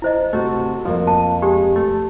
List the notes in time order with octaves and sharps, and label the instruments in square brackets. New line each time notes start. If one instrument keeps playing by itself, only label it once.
[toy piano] E4 C5 D#5
[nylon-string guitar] C3 F#4 [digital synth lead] A3
[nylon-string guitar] F2 A#3 [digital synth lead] F3
[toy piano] A5
[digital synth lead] G#3 [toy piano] G4
[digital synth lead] A3